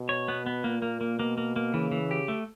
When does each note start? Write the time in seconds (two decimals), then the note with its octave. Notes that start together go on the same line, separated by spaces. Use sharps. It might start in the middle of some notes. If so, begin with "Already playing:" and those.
Already playing: B2
0.09 C#5
0.28 B3
0.46 B3
0.64 A#2 A#3
0.82 A#3
1.01 A#3
1.19 B2 A#3
1.38 A#3
1.56 A#3
1.74 C#3 E3
1.92 E3
2.11 G4
2.28 A3